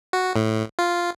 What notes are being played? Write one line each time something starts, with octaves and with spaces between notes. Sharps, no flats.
F#4
A2
F4